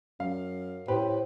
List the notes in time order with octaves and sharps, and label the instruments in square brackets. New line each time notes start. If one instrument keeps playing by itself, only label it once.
[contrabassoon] F#2 [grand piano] F5
[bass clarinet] A2 [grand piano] G4 B4 [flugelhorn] C5